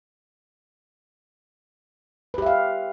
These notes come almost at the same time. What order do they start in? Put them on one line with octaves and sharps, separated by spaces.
B4 G4 E5 F5